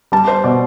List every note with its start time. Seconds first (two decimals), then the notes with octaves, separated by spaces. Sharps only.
0.12 G3 A5
0.28 C5
0.44 B2 D5